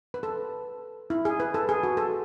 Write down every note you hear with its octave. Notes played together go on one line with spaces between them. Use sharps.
B4
A4
E4
G#4
B4
A4
G#4
F#4
A4